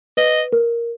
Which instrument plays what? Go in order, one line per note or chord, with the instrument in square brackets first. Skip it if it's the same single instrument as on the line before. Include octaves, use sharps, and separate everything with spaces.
[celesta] B4 [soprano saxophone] D#5
[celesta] A#4